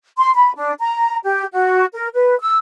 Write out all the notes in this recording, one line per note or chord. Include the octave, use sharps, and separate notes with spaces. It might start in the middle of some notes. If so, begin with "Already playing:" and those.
C6
B5
D4
A#5
G4
F#4
A#4
B4
E6